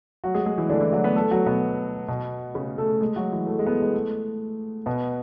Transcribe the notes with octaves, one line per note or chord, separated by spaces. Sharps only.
F#3 F#4
G#3 G#4
G#3 G#4
E3 E4
D3 D4
E3 E4
F#3 F#4
B3 B4
A3 A4
F#3 F#4
B2 B3
B2 B3
C#3 C#4
A3 A4
G#3 G#4
F#3 F#4
E3 E4
A3
G#3
B3
A3
G#3
A3
B2 B3